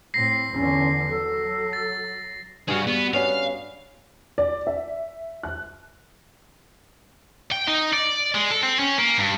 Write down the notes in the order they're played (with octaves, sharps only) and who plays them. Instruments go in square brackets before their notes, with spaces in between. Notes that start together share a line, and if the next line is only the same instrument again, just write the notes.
[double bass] A2 C4 [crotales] A#6 C7
[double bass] E2 D3 [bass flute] C#4
[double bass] F#3 [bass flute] A4
[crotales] A6
[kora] G2 F#4 [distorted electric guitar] G#4 F5
[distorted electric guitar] B3
[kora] B3 C#4 D4 [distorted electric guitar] F5
[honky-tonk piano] D5
E5
F#6
[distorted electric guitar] G5
D#4
D5
G#3
A4
C4
C#4
A#3
G2